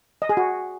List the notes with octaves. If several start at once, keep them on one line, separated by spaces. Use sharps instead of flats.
D#5
G#4
F#4